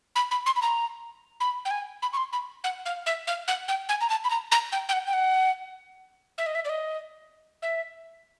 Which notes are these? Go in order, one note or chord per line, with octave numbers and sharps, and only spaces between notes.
B5
B5
C6
B5
A#5
B5
G5
G#5
B5
C#6
C6
B5
F#5
F5
E5
F5
F#5
G5
G#5
A#5
A5
B5
A#5
A#5
G5
G5
F#5
G5
F#5
E5
D#5
E5
D5
D#5
E5